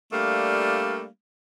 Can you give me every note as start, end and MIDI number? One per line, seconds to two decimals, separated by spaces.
0.12 1.06 55
0.12 1.06 57
0.12 1.06 58
0.12 1.06 62
0.12 1.06 77